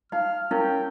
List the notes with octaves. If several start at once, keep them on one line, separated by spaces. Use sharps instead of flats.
D#4 F5 F6
C#4 D#4 E4 A#4 G5